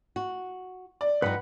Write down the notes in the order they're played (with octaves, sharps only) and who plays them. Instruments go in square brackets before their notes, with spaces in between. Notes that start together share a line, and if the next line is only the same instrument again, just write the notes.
[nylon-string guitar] F#4
[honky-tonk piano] D5
[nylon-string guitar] G2 F3 D#4 [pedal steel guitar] B4 F#5 B5